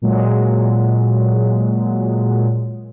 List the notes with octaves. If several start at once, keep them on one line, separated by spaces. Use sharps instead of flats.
A#2 F#3 G#3